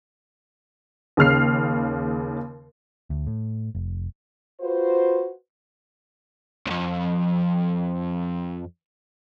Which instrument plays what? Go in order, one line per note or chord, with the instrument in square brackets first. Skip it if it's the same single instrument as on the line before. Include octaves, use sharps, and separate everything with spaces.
[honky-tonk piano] D#2 C#3 F6 C7
[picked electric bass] D2
A2
F1
[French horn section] F4 F#4 B4 C5
[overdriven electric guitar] C2 F2